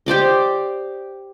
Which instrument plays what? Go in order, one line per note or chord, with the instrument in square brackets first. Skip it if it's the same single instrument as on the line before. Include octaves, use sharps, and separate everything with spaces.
[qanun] G4 C5 D5 D#5